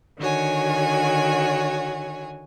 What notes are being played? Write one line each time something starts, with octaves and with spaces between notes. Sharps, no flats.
D3 D#3 F#4 C#5 G#5